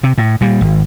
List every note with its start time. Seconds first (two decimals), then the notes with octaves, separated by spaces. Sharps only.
0.03 C3
0.18 A2
0.41 A#2 G3
0.61 G#1